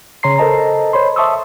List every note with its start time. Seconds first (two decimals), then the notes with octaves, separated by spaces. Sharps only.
0.23 C#3 C#5 A#5 C6 C7
0.38 A4 A#4 C5 D#5 A5 A#5
0.93 C5 C#5 B5 C6
1.16 E5 A5 C6 C#6 D#6 E6